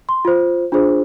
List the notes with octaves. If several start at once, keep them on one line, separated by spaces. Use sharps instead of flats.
C6
F4 C5
D4 F4 G#4 C5